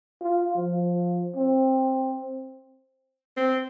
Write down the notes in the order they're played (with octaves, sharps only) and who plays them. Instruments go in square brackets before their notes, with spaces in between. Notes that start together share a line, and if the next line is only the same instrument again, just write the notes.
[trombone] F4
F3
C4
[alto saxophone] C4